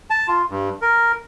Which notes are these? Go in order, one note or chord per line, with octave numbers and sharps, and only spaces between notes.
A5
F4
G2
A#4